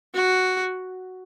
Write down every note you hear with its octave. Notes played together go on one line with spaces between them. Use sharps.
F#4